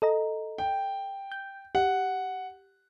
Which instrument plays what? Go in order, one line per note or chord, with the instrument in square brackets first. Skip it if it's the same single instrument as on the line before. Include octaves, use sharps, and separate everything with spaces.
[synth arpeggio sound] A4 D#5 A#5
[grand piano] G5
[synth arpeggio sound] G6
[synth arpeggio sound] G4 [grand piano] F#5